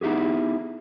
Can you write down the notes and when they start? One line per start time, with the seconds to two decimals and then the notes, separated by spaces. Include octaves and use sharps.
0.01 B3 D#4 E4 G4 G#4